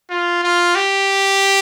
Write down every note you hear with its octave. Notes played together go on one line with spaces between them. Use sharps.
F4
F4
G4